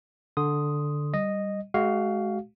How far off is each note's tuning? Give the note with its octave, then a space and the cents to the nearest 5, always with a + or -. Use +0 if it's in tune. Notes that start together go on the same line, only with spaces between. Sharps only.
D3 +0 C6 +0 D#6 +0
G3 +0 D#5 -5
G#3 +30 F#4 +25 F5 +0